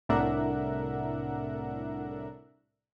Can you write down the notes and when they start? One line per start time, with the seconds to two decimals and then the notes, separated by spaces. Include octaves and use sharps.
0.09 C2 A2 D4 A#4 E5 F#5